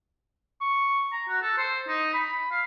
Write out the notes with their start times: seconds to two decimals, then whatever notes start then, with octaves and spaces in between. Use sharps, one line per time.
0.61 C#6
1.13 A#5
1.29 F#4
1.42 A4
1.58 C5
1.88 D#4
2.13 B5
2.52 F5